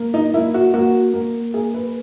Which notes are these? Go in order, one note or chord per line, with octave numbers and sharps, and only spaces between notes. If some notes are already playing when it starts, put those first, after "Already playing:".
Already playing: A#3
D#4
A#3 E4
F#4
A#3 F#4
A#3
A#3 G#4
B4